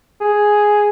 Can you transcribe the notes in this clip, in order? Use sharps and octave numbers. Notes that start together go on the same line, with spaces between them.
G#4